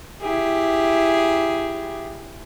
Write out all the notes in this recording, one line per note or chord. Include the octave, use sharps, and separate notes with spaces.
E4 G4 G#4